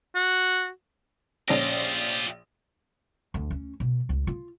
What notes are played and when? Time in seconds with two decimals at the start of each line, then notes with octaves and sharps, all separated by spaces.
0.15 F#4
1.48 A#1 C#4 F4 G4 A#6
3.34 D2
3.51 C#4
3.80 B2
4.09 C#2
4.27 F4